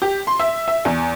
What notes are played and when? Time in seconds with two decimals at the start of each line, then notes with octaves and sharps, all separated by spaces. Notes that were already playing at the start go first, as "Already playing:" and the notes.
0.02 G4
0.27 C6
0.39 E5
0.68 E5
0.85 E2